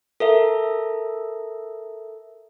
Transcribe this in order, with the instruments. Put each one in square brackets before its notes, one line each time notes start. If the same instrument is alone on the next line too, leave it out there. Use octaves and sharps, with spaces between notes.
[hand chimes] A4 A#4 E5